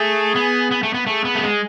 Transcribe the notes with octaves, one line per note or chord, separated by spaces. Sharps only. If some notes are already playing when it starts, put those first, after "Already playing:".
Already playing: A3 G#4
B3
B3
A3
B3
A3 G#4
B3
A3
G#3